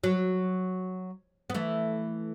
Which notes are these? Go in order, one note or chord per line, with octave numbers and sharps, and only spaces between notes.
F#3
B3
E3 A3